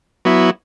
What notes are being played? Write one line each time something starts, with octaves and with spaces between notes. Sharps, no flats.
F#3 B3 E4